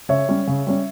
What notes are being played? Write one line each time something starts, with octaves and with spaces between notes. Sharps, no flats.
C#3 C#5 E5
G3 C#4
C#3
G3 C#4